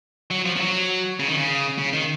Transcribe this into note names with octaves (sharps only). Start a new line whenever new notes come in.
F#3
F3
F3
F#3
C#3
D#3
C#3
C#3
D#3